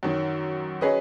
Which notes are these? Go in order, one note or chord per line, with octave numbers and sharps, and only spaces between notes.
F#2 D#3 F#3
F#3 C#4 G#4 B4 D#5